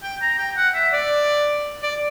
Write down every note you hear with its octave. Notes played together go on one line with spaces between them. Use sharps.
G5
A#5
G5
F#5
E5
D5
D5